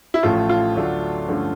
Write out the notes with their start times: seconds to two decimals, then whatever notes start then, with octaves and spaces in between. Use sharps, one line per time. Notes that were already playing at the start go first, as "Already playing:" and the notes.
0.14 E4
0.23 A1 A2 F3 A3 C#4 F4
0.49 F4
0.76 D2 D3 F#3 A3 D4
1.29 G2 D3 F3 A3 C#4